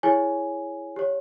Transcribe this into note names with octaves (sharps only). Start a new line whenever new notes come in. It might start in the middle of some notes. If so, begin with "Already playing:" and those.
E4 G#4 C#5 G#5
G4 C#5